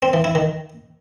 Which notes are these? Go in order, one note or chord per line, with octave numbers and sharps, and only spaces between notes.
C4
E3
E4
D#3